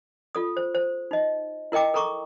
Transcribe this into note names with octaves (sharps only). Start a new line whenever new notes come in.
F4 A4 D#6
C5
C5
D#4 D#5
E4 A#4 D#5 G5 D6
A4 A#4 A#5 C#6 D6